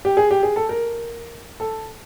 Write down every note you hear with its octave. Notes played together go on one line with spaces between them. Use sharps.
G4
G#4
G4
G#4
A4
A#4
A4